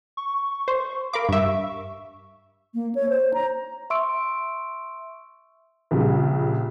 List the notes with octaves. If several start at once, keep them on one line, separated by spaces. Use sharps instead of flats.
C#6
C5
A#4 F5 B5 D6
G2 E5 C#6
A#3
C#5
C5
A#5
E5 C6 C#6 E6 D7
A#1 C#3 G3